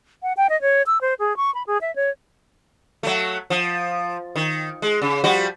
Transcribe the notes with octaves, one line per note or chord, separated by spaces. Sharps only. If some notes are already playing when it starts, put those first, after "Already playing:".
F#5
G5
D#5
C#5
E6
C5
G#4
C#6
B5
G#4
E5
C#5
F#3 A3
F3
D#3
G#3
C#3
F3 G3 F#4